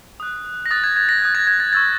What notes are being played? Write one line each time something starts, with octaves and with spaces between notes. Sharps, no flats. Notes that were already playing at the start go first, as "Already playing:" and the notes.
D#6 F#6
A#6
D#6 F#6 A6
G#6
G#6
A#6
D#6 F#6
G#6
G#6
A6
C#6 E6 G6 A6